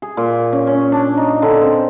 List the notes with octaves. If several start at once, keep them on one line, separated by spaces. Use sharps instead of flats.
G#4
A#2
C#4
C#4
D4
D#4
D3
C4